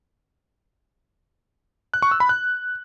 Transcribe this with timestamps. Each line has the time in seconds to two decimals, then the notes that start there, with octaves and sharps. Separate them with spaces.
1.94 F#6
2.02 C#6
2.11 E6
2.20 B5
2.29 F#6